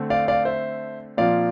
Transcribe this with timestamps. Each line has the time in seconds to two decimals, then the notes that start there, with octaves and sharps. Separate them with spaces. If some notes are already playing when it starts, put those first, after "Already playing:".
Already playing: D3 A3 C4
0.10 D5 F5
0.28 D5 F5
0.45 C5 E5
1.17 A#2 F3 C4 D5 F5